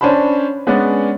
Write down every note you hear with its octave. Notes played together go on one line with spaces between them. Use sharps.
C#4 D4 C5 A5 B5
G#3 B3 C#4 D4 D5 F#5